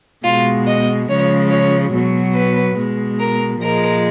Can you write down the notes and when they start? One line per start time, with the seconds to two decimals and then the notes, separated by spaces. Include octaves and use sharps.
0.25 B2 G#3 F4
0.67 D#5
1.10 C#3 F3 G#3 C#5
1.51 C#5
1.93 B2 F#3
2.36 B4
2.77 B2 G#3
3.20 A#4
3.62 A#2 F3 G#3 A#4